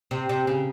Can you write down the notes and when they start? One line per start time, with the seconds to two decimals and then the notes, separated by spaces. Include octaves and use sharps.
0.11 C3
0.29 C3
0.47 C#3